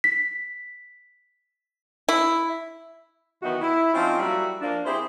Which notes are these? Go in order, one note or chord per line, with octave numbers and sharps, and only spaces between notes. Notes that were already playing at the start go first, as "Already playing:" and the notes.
B6
E4
D#3 E3 F#3 B3 D#4 F#4
E4
F3 C4 C#4 D#4 F4
F#3 G3 A#3 E4 F#4
F3 A#3 D4
C4 E4 G4 G#4 C5